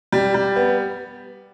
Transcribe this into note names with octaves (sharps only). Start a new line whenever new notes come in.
G3
G3
B3